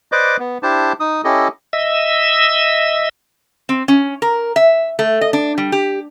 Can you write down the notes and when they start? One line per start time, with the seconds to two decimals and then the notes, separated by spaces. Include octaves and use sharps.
0.12 B4 C5 D5 D#5 D6
0.39 B3
0.63 D4 E4 G4 C5 A5
1.00 D#4 D#6
1.24 C#4 E4 G4 A4 D#5
1.73 D#5 E5 E6
3.69 C4
3.88 C#4
4.22 A#4
4.56 E5
4.99 A3
5.21 D#5
5.33 D4
5.58 G3
5.72 G4